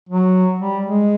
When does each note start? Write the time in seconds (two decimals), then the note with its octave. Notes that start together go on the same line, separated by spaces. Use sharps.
0.09 F#3
0.60 G3
0.86 G#3